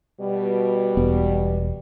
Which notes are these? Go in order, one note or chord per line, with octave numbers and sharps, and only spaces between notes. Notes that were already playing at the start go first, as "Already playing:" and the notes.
B2 G3
E1 B3